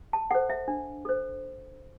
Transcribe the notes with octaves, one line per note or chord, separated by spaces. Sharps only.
A5
A4 C5 F#5
E5
D4
A4 C5